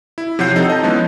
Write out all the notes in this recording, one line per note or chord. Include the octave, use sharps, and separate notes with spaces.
E4
C3 F3 C#5 F#5 G6 C7
C4 D#4 A4
D#5 A5
E3 F3 G#3 B3 C#4